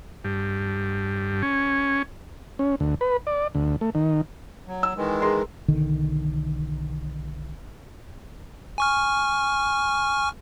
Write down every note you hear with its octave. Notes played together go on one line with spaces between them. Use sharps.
G2
C#4
C#4
D2
B4
D5
D2
A3
D#3
F#3
E6
D#3 E3 G#3
G#4 A#4 C6
B1 D3 D#3
G#5 C#6 F6